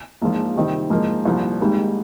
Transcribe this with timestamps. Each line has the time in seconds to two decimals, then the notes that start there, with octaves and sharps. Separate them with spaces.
0.21 A#1 G#2 F3
0.56 C3 D#3 G3 C4 D#4
0.90 G#2 F3 A#3 D#4
1.25 C2 A#2 F3
1.60 G#1 G#2 G3 A#3